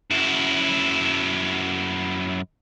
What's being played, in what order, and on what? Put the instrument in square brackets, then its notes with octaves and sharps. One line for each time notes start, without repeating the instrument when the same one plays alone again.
[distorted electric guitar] F#2 E4